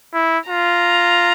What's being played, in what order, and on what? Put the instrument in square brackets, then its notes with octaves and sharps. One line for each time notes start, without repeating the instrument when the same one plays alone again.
[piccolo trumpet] E4
[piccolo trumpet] F4 [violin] A#5